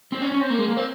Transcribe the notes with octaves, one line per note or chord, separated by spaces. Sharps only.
C4
C#4
C#4
C4
A#3
G#3
A#3
C4